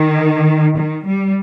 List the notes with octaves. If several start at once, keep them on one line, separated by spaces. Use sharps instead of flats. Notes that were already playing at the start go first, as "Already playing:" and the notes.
Already playing: D#3
D#3
G3